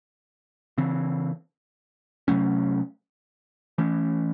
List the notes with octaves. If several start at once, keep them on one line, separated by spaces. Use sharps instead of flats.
C#3 E3 C4
C3 F#3 A3 C#4
E3 A3 C#4